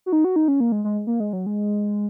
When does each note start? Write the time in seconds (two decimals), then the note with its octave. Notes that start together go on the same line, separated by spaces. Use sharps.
0.06 F#4
0.12 D#4
0.24 F#4
0.36 D#4
0.48 C#4
0.60 A#3
0.72 G#3
0.84 G#3
1.07 A#3
1.20 G#3
1.33 F#3
1.46 G#3